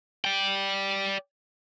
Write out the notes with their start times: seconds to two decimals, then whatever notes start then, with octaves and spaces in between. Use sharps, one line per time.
0.25 D5 G5